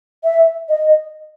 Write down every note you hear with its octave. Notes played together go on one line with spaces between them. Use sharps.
E5
D#5